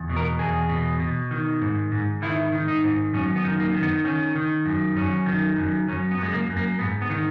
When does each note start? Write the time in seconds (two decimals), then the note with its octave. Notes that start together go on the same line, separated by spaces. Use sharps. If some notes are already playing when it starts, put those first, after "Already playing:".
Already playing: E2
0.09 B2
0.17 A#4
0.39 E2 G#4
0.69 B2
1.00 B2
1.31 D#3
1.61 G#2
1.92 G#2
2.22 D#3 E4
2.52 D#3
2.68 D#4
2.83 G#2
3.14 F#2 C#4
3.36 B3
3.44 D#3
3.60 A#3
3.74 D#3
3.83 B3
4.04 D#3 C#4
4.35 D#3
4.65 F#2
4.96 F#2 C#4
5.26 D#3
5.57 F#2
5.88 F#2 C#4
6.11 B3
6.18 F#2 G#3
6.33 A#3
6.49 F#2
6.57 A#3
6.79 G#2 B3
7.02 B3
7.10 D#3